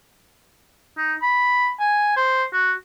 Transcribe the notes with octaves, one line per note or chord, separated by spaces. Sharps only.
D#4
B5
G#5
C5
F#4